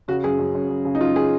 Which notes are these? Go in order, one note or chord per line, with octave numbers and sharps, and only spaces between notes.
C#3 F#4
F#2 G#4
F#2
F#2
F#2
C#3
D#4
F#2 F4
G#4